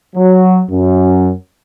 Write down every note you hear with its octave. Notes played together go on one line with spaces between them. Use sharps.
F#3
F#2